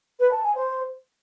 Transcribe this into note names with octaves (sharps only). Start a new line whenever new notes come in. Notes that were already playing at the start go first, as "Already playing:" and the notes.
B4
A5
G#5
C5